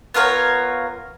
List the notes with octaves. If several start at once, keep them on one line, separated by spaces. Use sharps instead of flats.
B3 F4 A#4 C#5